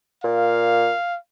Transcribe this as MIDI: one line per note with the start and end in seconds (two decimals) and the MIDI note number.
0.24 0.91 46
0.24 1.17 77